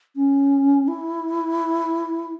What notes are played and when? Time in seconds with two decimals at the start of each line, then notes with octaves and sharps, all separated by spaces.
0.16 C#4
0.88 E4